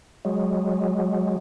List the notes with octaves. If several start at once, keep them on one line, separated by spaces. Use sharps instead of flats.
F#3 G#3